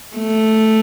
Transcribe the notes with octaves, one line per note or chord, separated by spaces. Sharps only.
A3